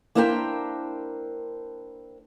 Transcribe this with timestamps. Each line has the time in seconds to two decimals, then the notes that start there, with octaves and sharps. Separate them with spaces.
0.15 A#3 D4 E4 A#4 C5 G5